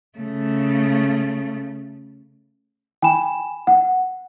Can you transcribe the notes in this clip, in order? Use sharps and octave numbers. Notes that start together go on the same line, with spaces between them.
C#3 A3
G5 G#5 B5 E7
F#5